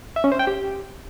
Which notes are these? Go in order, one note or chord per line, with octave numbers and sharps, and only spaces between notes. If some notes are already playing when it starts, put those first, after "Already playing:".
E5
C#4
C5
G5
G4